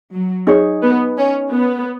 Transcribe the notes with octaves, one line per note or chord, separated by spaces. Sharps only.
F#3
D#4 G#4 C#5
B3
C#4
B3